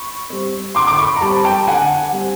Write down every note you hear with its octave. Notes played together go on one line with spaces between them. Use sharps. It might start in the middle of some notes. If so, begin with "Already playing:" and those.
Already playing: B5 C#6
G3 C4
D3 C6 D6
D6
B5 C#6
A#5
G3 C4 A5 B5
G5 A5
D3 F#5 G#5
G3 C4